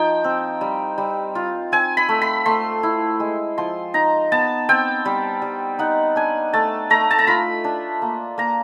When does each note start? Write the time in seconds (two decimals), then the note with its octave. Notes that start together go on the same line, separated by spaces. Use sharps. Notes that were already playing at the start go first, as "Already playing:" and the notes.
Already playing: F3 D#4 G5
0.24 C4
0.61 G3
0.98 G3
1.35 F4
1.72 C4 G#5
1.97 B5
2.09 A3
2.22 B5
2.46 A3 C6
2.83 E4
3.20 G#3
3.58 F3 C6
3.94 D#4 A#5
4.32 B3 A5
4.69 C4 G5
5.05 G3
5.42 G3
5.79 D#4 F#5
6.16 D4 G#5
6.53 A3 A5
6.90 A3 A#5
7.11 A5
7.19 A#5
7.27 F4 B5
7.64 D4
8.02 A#3
8.38 A#3 A#5